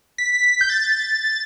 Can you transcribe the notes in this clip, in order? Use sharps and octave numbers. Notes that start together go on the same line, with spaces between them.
B6
G6
A6